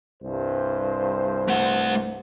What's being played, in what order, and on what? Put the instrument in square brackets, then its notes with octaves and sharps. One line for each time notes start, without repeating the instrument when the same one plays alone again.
[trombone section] C2 G2 C5
[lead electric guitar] A3 F#5